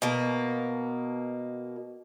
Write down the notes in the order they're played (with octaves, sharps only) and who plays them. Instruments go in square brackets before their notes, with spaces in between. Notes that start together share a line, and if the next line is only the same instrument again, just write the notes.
[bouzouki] B2 A#3